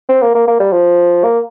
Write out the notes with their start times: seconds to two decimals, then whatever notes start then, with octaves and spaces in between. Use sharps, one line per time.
0.09 C4
0.22 A#3
0.35 A#3
0.48 A#3
0.60 G3
0.73 F3
1.24 A#3